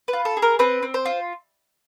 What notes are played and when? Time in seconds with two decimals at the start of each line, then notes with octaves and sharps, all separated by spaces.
0.08 B4
0.13 F4
0.25 A4
0.37 G#4
0.42 A#4
0.59 C4 B4
0.83 C4
0.94 C5
1.05 F4